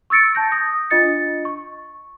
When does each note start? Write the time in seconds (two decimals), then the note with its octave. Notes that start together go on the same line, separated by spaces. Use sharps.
0.10 C#6 E6 A6 C#7 D7
0.35 A5 G6 A#6
0.52 D#6 A#6
0.90 D4 F4 D#5 A6 C#7
1.45 C#6